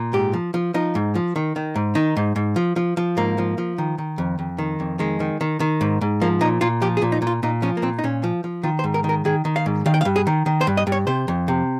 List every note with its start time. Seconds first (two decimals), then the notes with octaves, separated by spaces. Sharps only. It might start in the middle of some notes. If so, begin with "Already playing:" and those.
Already playing: A#2
0.13 G#2 G4
0.33 F3
0.54 F3
0.74 F3 D#4
0.95 G#2
1.15 F3
1.36 D#3
1.56 D#3
1.76 G#2
1.95 D#3 D#4
2.17 G#2
2.36 G#2
2.56 F3
2.76 F3
2.97 F3
3.17 G#2 A#3
3.38 F3
3.58 F3
3.78 D#3
3.98 D#3
4.18 F2
4.39 F2
4.58 D#3
4.80 F2
4.99 D#3 G#3
5.20 D#3
5.41 D#3
5.60 D#3
5.81 G#2
6.01 G#2
6.21 F3 A#3
6.41 A#2 D#4
6.61 A#2 F4
6.82 F3 G4
6.97 G#4
7.02 A#2
7.12 D#4
7.22 A#2
7.27 F4
7.43 A#2 D#4
7.62 F3 C#4
7.77 A#3
7.82 A#2 C4
7.99 D#4
8.04 A#2 C#4
8.24 F3
8.44 F3
8.63 D#3 F4
8.79 C5
8.84 G#2
8.94 A#4
9.04 D#3
9.09 A#4
9.25 D#3 G#4
9.45 D#3
9.56 F5
9.66 G#2
9.86 D#3 F5
9.94 G5
10.01 F5
10.05 G2
10.16 G#4
10.27 D#3
10.46 D#3
10.61 C5
10.67 G2
10.77 D#5
10.87 G2
10.92 C#5
11.07 C3 C5
11.28 F2
11.48 C3